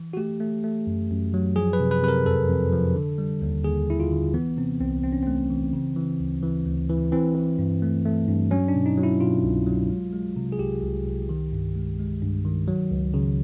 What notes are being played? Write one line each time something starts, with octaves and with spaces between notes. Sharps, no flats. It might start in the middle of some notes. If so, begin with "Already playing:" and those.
Already playing: E3
F#4
A3 G4
A3
A3
F#2
F#2
F#3
F3 G#4
B4
C3
B4
C3 B4
A#4
F2 A4
F2
F3
D3
G3
D#2
D#2 G#4
D#2 E4
F4
D3
E3 B3
C3 C4
C2 C4
C2 C4
C#4
A3 C4
E3
C#3
E3
D2
E3
D2
E3
E3 C4
E3
G2
A3
A3
G2
F#3 C#4
D4
B2
D#4
F#3
E4
B2 F4
C2
F#3
G#3
G#3
C3
G#4
C2 G4
C2
C2
D#3
G2
G#3
G#3
G2
D#3
F#3
C#2
C#3